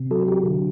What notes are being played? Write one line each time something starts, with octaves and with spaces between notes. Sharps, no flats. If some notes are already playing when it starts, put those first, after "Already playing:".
Already playing: C3
F#3 A4
G4
D3